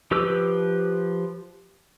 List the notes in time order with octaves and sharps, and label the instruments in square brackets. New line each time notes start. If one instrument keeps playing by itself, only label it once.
[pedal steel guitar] F3 G4 B4 D6 E6